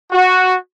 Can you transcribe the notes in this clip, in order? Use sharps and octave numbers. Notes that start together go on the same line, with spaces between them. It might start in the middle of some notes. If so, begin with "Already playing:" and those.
F#4